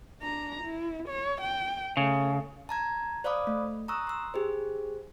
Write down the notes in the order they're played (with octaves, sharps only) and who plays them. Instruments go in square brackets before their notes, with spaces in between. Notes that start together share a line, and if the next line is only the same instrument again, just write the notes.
[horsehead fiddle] D4 A#5
E4
C#5
G5
[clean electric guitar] C#3 [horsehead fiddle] A3
[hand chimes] A5 A#5 G#6
C5 D5 F5 B5 D6 D#6
A3
A#5 C#6 D#6 E6 F#6
C6 E6
G4 G#4 C5